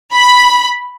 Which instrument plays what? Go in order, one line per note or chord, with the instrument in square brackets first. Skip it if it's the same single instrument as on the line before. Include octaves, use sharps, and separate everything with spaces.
[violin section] B5